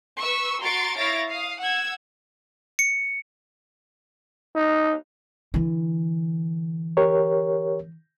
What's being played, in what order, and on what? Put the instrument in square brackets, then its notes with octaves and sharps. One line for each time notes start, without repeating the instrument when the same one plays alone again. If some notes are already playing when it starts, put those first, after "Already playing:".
[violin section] B4 C#6 E6
F#4 A#5 C6 C#6 A6 D7
E4 C#5 F5 A6 A#6 D7
F5 D#6
F#5 E6 G#6
[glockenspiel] C#7
[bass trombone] D#4
[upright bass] D3 E3
[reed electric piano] G4 A#4 C#5